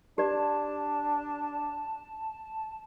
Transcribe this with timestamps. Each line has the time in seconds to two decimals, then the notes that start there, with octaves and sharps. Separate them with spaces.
0.18 D4 G4 D5 A5